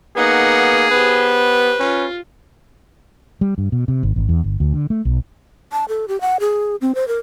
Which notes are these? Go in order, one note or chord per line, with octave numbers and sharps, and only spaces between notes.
A#3 B3 D#4 G#4 F#5
B3 G4 B4 C5
C#4 F4
G3
G2
B2
C3
G#1
G#1
E2
G1
D2
D3
A3
B1
A5
A4
G4
F#5
G#4
C4
C5
A#4